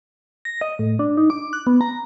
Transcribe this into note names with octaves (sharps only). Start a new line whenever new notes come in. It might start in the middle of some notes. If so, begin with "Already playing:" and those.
A#6
D#5
A2
D4
D#4
D6
F#6
B3
A#5